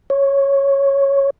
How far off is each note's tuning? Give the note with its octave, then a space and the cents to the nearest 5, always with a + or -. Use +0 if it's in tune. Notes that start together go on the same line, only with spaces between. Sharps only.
C#5 -5